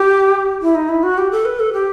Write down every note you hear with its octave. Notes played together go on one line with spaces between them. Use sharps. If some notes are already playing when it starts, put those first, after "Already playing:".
Already playing: G4
E4
D#4
E4
F#4
G4
A4
B4
A4
G4